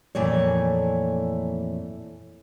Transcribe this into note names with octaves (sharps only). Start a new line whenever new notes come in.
F2 A#2 E3 A3 C#5